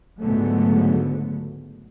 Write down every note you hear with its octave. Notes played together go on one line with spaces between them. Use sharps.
C#2 G#2 D3 F#3 A3 B3